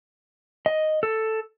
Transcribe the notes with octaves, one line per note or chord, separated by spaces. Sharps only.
D#5
A4